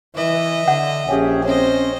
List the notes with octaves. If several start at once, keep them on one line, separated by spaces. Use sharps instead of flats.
E3 D#5 E5
D3 F#5
A#1 C#4 G4 G#4
C4 C#4 C5 D#5